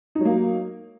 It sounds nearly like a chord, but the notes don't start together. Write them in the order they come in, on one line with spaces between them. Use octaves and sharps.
D#4 F#3 A#3